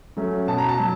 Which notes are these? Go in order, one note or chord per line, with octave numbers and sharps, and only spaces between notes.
F#3 A3 C#4
B2 A5
A#5
A5
F#3